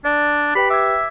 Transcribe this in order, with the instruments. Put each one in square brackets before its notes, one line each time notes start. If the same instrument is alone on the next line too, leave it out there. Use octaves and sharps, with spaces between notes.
[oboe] D4 [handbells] D5
[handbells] G4 B4 G5 [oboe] B5
[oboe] E5 [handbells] D6 G#6